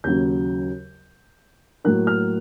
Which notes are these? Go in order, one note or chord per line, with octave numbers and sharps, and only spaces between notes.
D#2 C#3 F#3 G6
A2 F#3 A#3 F#6
F6